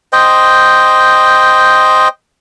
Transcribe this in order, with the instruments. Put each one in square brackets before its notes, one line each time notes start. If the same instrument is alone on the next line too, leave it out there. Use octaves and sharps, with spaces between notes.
[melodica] C5 D#5 G5